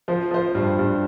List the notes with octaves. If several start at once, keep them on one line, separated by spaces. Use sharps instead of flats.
F3 C5
F3 C5
G2
G2